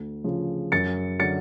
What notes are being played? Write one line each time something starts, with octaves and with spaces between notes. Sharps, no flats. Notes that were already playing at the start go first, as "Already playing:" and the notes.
Already playing: D2
C#3 F3
F#2 A6 C#7
D3 F#3 A6 C#7